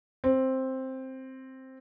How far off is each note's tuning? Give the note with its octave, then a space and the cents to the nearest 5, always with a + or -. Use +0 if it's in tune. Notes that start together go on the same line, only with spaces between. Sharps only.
C4 +5